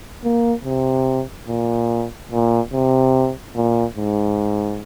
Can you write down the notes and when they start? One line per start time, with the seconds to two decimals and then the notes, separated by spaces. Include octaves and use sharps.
0.24 A#3
0.65 C3
1.48 A#2
2.32 A#2
2.73 C3
3.56 A#2
3.97 G#2